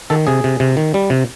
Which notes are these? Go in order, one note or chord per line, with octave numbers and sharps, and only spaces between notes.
D#3 A4
C3 G#4
C3
C3
D#3
G3
C3